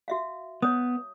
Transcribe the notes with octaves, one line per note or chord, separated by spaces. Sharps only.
F#4 E5 F5
B3 C#5 D#6